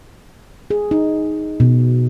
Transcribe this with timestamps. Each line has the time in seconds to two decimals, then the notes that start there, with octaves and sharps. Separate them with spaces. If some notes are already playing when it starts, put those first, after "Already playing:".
0.70 G#4
0.91 D#4
1.60 B2